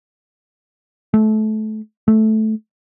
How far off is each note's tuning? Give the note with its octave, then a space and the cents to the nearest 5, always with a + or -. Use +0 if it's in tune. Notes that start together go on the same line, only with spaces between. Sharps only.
A3 -25
A3 -10